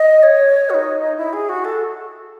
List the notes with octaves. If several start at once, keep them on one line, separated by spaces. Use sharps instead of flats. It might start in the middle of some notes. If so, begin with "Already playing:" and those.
Already playing: D#5
C#5
F#4
D#4
E4
G#4
F#4
A4